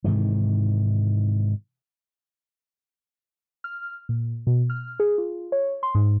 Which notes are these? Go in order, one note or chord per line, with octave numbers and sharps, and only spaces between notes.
G#2 C3 D#3 E3
F6
A#2
B2
F6
G#4
F4
C#5
C6
G#2